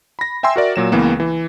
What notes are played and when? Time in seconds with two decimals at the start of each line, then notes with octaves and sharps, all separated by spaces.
0.19 B5 A#6
0.43 E5 G5 G#5 C6 E6
0.56 F#4 A#4 D5 E5
0.76 A#2 F#3 E7
0.92 C#2 E3 A#3 B3
1.20 E3